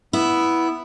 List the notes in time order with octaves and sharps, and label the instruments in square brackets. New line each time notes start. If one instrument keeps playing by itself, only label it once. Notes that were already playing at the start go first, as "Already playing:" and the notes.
[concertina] B3 [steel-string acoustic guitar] E4